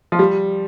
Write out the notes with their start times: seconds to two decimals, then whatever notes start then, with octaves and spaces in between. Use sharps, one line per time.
0.12 F3
0.19 G3